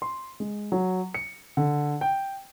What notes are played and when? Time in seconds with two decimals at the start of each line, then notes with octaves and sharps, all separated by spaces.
0.02 C6
0.40 G#3
0.72 F#3
1.14 C#7
1.57 D3
2.01 G5